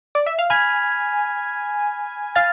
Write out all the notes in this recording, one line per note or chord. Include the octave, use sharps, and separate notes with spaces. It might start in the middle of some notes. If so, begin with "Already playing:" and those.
D5
E5
F5
G#5 B5 F6 G#6 B6 F7
F5 F6 A6